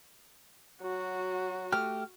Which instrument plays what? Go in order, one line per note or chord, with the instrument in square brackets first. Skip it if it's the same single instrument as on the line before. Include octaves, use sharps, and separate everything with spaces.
[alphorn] F#3 [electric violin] F#4
[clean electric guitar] A3 G4 [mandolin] F6